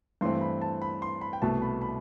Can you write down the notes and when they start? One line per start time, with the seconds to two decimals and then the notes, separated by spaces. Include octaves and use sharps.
0.21 G2 E3 A3 C4 C6
0.41 B5
0.62 A5
0.82 B5
1.02 C6
1.21 B5
1.33 G5
1.42 C2 B2 A3 A5
1.62 B5
1.81 B5